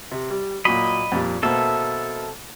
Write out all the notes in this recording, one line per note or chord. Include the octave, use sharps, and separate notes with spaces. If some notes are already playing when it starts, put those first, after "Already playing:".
C3
G3
A#2 F#3 D#5 B5
F2 A#2 G3
B2 A#3 C4 A4 E5